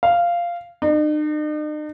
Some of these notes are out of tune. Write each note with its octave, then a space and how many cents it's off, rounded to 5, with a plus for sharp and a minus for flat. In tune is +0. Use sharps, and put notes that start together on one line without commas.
F5 -10
D#4 -45